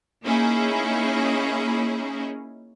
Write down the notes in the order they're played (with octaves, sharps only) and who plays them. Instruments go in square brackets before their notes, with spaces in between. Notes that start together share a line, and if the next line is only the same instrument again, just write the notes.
[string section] A#3 C#4 D#4 E4 G#4